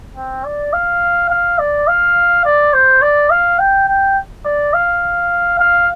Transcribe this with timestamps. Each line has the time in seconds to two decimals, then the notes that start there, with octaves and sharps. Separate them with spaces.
0.16 C4
0.45 D5
0.73 F5
1.30 F5
1.59 D5
1.88 F5
2.45 D5
2.74 C5
3.02 D5
3.31 F5
3.59 G5
3.88 G5
4.45 D5
4.74 F5
5.60 F5